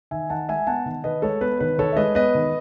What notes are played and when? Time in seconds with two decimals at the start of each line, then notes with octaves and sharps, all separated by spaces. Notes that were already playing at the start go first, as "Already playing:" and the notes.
0.11 D#3 E5 G#5
0.30 D#3 F#5 A5
0.49 G#3 E5 G#5
0.67 B3 F#5 A5
0.86 D#3
1.04 D#3 B4 D#5
1.22 G#3 A4 C#5
1.41 B3 B4
1.60 D#3 B4
1.78 D#3 A4 C#5
1.92 E5
1.97 G#3 B4 D#5
2.15 B3 B4 D#5
2.35 D#3